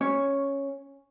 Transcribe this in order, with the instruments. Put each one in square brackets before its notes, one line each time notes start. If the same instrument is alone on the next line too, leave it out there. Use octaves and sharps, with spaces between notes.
[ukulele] C#4 C#5